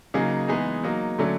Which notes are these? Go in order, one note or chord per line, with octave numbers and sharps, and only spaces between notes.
C#3 F#3 A#3 D#4 G#4
E3 G#3 B3 D#4 G#4
F#3 A#3 D#4
D3 F#3 A3 C#4